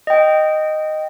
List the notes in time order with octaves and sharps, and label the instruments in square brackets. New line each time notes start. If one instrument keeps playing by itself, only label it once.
[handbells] D#5 G5